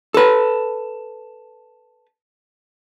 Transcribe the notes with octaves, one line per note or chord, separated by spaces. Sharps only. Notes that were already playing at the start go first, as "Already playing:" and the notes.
A4 B4